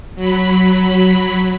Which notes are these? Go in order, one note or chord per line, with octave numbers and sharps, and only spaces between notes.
F#3 B5